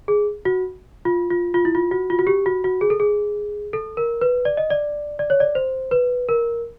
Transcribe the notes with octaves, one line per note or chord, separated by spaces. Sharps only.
G#4
F#4
F4
F4
F4
E4
F4
F#4
F4
F#4
G4
F#4
F#4
G#4
A4
G#4
A4
A#4
B4
D5
D#5
D5
D5
C#5
D5
C5
B4
A#4